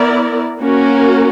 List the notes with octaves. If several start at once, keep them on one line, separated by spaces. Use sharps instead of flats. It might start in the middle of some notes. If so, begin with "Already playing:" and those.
Already playing: B3 E4 A#4 D5
A#3 C#4 F#4 A#4